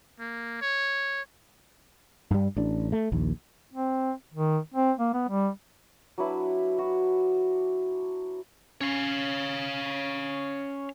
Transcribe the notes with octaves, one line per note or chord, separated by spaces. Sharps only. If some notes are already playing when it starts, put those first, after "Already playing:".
A#3
C#5
G2 G3
A1 D4
A3
A#1 D#2
C4
D#3
C4
A#3
B3
G3
F#3 D4 E4 B4
F#4
C#4 C#5 F5